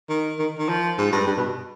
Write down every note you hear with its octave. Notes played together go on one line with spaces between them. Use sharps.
D#3
D#3
D#3
F3
G#2
G2
G2
B2